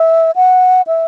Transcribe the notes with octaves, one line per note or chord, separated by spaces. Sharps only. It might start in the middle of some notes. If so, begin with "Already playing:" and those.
Already playing: E5
F#5
E5